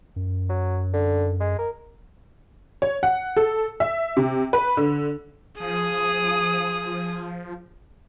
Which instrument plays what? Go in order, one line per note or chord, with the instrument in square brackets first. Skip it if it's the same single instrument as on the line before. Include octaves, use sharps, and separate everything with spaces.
[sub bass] F#2
[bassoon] F#3
D3
G#3
A#4
[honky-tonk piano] C#5
F#5
A4
E5
C3
B4
D3
[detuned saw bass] F3 [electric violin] G#4 D#6